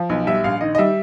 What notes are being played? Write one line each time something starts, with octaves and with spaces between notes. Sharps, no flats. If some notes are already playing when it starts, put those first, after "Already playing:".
Already playing: F3
B1
G3 E5
A#1 F5
D#3 D#5
D#5
G3 E5